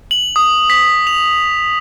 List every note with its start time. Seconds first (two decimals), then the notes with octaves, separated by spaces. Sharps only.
0.11 F#7
0.36 D#6
0.70 B6
1.07 F7